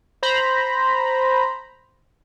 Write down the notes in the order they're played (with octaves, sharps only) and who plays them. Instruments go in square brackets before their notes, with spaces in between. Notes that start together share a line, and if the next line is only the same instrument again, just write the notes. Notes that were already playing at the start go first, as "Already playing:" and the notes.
[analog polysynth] C5 A#5 B5